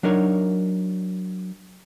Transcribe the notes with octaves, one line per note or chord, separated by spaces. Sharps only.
F#3 D4 D#4 A#4 C#5